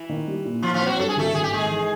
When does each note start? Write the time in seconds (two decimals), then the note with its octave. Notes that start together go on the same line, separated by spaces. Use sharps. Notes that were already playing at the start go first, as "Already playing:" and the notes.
Already playing: E3 E4
0.09 D#3
0.27 G3
0.45 A#2
0.62 A#2 F3 F4
0.74 F3 F4
0.81 C4
0.86 F#3 F#4
0.99 G2 A4
1.09 G#4
1.16 G#1 A3 A4
1.34 G#1 G#4
1.44 G4
1.53 D#3 G#3 G#4
1.70 E3